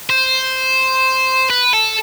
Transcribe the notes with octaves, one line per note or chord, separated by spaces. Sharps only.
C5
B4
A4